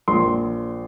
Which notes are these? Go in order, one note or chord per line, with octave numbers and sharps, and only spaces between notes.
A#1 C6